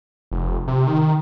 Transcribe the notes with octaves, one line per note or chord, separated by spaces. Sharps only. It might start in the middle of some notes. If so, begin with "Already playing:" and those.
F1
C3
D#3
D#3